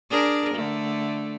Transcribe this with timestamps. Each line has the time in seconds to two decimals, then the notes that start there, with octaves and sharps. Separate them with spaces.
0.10 D4 G#4 A#4
0.54 D3 A3